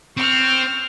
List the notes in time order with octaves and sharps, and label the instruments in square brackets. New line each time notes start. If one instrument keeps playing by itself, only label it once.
[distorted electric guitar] C4 [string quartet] C#6 F6 G6